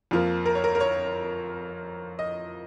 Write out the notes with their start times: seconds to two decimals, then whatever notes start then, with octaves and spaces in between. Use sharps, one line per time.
0.11 F2 F3 A#3
0.46 A#4
0.55 C#5
0.64 A#4
0.75 A#4
0.80 C#5
2.19 D#5